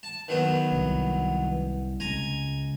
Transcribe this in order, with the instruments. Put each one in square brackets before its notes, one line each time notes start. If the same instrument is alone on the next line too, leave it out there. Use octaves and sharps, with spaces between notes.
[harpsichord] A5
D#3 F#3 B3
[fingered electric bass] C2
[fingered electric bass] C#2 [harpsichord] G#5 A#5